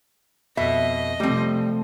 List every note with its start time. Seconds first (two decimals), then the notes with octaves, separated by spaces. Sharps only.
0.57 F2 B2 D#5 E5
1.20 C3 F3 G3 A3 C4